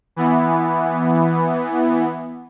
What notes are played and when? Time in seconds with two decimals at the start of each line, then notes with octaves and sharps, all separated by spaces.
0.16 E3 B3